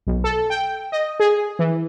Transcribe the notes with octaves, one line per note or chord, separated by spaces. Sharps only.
B1
A4
G5
D#5
G#4
E3